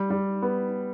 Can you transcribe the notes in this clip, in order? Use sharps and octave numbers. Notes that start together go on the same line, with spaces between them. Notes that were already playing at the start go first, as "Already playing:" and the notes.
Already playing: G3
G3
B3